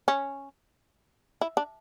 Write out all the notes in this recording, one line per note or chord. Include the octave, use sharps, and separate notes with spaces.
C#4
E4
D4